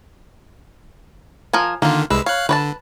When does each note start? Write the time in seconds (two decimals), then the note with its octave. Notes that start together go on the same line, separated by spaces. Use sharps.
1.53 F3 A#4 G#5
1.82 D3 D#3 A#3 F4
2.10 C2 G#3 B4 E6
2.26 C#5 F5 F#6
2.49 D3 B4 C#5 A5